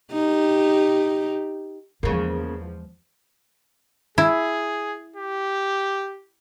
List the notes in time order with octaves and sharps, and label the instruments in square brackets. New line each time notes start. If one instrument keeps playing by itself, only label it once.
[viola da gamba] D#4 G4
[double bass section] E2 F3 [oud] C#3 A#3 [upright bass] G#3
[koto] E4 [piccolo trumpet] G#4
[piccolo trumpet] G4